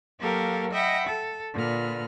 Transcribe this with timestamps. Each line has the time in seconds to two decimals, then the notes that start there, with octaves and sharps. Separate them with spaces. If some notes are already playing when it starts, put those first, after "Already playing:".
0.20 F#3 A#3 G4 A4 A#4 F5
0.72 D#5 E5 F#5 G5 B5
1.07 A4
1.54 A#2 D3 B4 F6